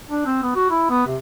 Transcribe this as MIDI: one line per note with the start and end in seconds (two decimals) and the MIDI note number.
0.10 0.25 62
0.26 0.42 60
0.43 0.52 59
0.55 0.68 66
0.70 0.88 64
0.90 1.06 59
1.07 1.17 48